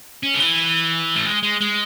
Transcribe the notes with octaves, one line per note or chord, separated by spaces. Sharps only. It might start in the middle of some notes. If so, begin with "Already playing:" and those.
C#4
D3
E3
A3
G#3
G#3
G#3